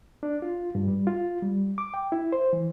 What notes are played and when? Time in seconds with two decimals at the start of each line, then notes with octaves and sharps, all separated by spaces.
0.23 D4
0.42 F4
0.75 G2
0.88 G3
1.07 F4
1.42 G3
1.78 D6
1.94 G5
2.12 E4
2.32 C5
2.53 E3